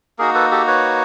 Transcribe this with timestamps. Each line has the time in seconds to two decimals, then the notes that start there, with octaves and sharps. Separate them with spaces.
0.19 A#3 D#4 F#4 G#4 A#4
0.35 A4 B4
0.51 G4 A4
0.67 B4 C#5